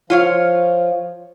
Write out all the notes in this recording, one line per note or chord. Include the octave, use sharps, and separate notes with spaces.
F3 F4 C#5 F5